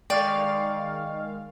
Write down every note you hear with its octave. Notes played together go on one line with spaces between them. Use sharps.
D#3 G#3 D5 F5 G5 C#6